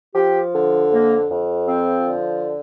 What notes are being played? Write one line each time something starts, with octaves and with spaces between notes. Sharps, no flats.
F3 G4
D3
F2 A#3
F2
F3 C4
D3